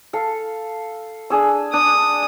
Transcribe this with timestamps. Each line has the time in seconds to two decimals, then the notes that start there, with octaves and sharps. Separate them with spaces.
0.13 A4 F5
1.30 D4 G#4 E6
1.73 D4 D#6